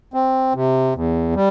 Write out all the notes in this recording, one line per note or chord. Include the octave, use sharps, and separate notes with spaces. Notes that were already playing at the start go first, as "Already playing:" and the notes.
C4
C3
E2
G3